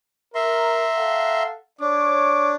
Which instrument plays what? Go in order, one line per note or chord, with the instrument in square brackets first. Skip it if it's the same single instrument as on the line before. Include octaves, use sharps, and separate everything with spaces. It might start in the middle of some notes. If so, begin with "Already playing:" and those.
[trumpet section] A#4 [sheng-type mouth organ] E5 A#5 C6
[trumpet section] A4 F5 F#5
[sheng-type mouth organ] D4 [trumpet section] C#5 D6